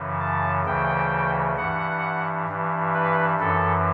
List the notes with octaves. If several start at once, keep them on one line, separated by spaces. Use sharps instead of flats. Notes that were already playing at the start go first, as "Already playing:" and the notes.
Already playing: F#2 C#3 E3
A5
D2 C#3 E3 G5
G2 E3 F#5
G2 E3
B4
F#2 E3 A4